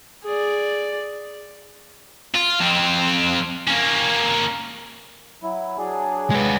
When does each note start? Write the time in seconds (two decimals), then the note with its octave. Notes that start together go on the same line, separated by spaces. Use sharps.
0.24 G#4 D5
2.34 F4
2.60 F2 C4
3.67 A#3 C#4
5.43 F#3 E4
5.78 F#3 D4 G#4
6.31 G#3 B4